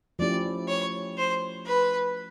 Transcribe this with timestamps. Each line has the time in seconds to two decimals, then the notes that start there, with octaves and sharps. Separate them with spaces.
0.19 F3 A3 C#4 E4 G4 D5
0.68 C#5
1.17 C5
1.65 B4